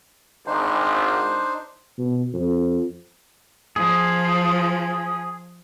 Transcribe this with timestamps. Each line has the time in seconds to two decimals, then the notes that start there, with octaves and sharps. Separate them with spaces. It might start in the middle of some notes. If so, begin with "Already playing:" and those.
0.47 G#1 D4 D#4 C5
1.98 B2
2.33 F2
3.76 F3 G#4